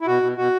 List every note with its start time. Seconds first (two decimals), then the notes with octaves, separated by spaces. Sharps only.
0.01 E4
0.07 B2 F#4
0.22 B2
0.37 B2 F#4